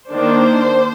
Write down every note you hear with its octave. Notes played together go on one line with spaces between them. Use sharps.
D#3 A#3 D4 C5